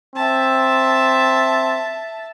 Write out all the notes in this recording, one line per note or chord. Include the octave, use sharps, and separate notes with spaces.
C4 E5 A5